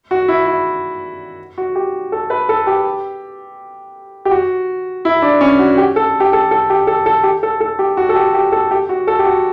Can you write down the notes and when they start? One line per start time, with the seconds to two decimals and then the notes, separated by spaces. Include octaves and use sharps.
0.11 F#4
0.28 E4
0.47 E4
1.58 F#4
1.75 G4
2.12 A4
2.30 B4
2.49 A4
2.67 G4
4.25 G4
4.31 F#4
5.05 E4
5.22 D4
5.41 C#4
5.59 F#4
5.78 G4
5.96 A4
6.20 G4
6.33 A4
6.51 A4
6.70 G4
6.87 A4
7.06 A4
7.23 G4
7.43 A4
7.61 A4
7.79 G4
7.97 F#4
8.09 A4
8.15 G4
8.34 G4
8.52 A4
8.71 G4
8.89 F#4
9.07 A4
9.19 G4
9.26 F#4